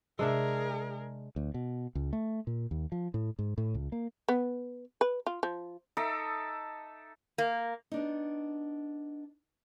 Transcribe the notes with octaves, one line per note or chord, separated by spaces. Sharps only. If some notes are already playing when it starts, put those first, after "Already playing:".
C3 G#3 D4 G#4 A#4 E5
D2
B2
C#2
A3
A#2
D#2
F3
A2
G#2
A2
C#2
A#3
B3
B4
F4
F3
D#4 A4 E5 D6
A#3
B3 D4 D#4